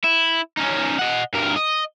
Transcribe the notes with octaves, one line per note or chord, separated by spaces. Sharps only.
E4
C#4 D#4
D#5 F#5
G2 A#4
D#5